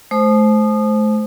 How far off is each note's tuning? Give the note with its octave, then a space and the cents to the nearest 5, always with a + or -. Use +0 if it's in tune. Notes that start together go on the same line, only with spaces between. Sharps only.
A3 -40 C5 +0 D#6 -25